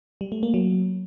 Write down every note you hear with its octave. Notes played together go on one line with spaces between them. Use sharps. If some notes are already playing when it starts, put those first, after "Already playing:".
G3
A3
A#3
F#3